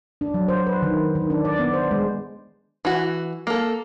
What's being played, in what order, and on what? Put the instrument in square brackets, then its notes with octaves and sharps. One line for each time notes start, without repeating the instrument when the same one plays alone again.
[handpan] D4
F#3
C5
B4
D#3
D#3
D4
D5
B3
C5
G#3
[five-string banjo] E3 F#4
A#3 A4